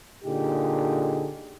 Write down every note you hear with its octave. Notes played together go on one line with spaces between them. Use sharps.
A#2 D3 D#4 G4 G#4